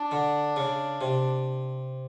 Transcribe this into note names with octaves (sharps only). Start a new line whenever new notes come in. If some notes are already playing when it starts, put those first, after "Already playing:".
Already playing: D4
D3
C#3
C3